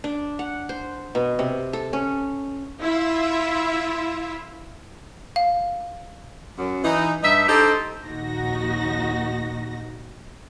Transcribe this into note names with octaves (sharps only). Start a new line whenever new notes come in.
D4
F#5
C5
B2
C3
A4
C#4
E4 F4 E5
F5
F#2
E3 D#4
G2 D#4 E5
D4 D#4 G4 A4 C5 D#5
A#1 D#2 D#4 F#4 A#6